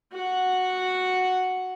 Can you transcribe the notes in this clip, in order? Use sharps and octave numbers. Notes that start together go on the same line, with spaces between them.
F#4 F#5